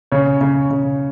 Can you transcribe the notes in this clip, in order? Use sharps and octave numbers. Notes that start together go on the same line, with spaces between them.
C#3 C#5
C#3
C#3